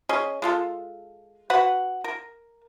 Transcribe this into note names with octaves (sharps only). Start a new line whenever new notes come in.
C#4 G#4 D#5
G#3 F4 A4
F#4 B4 F#5
A#4